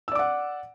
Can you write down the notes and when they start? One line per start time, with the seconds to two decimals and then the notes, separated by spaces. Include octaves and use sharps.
0.08 E6
0.12 D5
0.15 D6
0.19 F#5